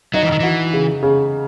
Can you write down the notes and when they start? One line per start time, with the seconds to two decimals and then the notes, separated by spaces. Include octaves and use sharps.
0.14 F#3 D#4
0.23 E3
0.32 D#3
0.40 E3 F#4
0.73 C#3
1.03 C#3